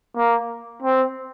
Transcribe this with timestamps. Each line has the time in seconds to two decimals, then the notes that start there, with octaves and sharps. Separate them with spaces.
0.17 A#3
0.82 C4